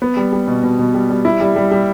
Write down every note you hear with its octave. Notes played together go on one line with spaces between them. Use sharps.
B3
G3
G3
B2
B2
B2
G3
G3
E4
G3
G3
G3